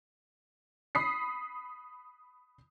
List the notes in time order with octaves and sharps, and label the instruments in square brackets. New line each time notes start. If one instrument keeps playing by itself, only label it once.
[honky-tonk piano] B5 D#6 B6 C7